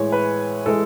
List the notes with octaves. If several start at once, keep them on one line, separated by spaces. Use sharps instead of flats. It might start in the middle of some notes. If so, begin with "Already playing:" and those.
Already playing: A2 E3 G#3 C#5
B4
E3 G#3 A4